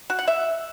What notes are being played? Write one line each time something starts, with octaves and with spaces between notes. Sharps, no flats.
F#4
F#5
E5